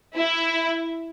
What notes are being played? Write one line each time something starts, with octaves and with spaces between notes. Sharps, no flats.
E4